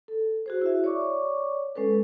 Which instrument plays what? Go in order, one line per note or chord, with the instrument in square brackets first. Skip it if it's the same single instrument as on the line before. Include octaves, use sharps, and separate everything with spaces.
[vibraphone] A4
F#4 G#4 C5
E4 F#4 E5
C#5 D5 C#6 D6
G#3 C#4 A4 B4